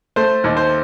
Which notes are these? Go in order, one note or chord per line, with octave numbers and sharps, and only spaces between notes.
A3 C5
D#2
C5